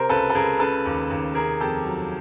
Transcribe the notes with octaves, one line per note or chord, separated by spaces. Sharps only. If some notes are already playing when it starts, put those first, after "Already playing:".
Already playing: C3 A#4 C5
C#2 A4 B4
A4
C#2 G#4 A#4
C#3 A4 B4
D#2
D#2
C3 G#4 A#4
F2 G4 A4
F#3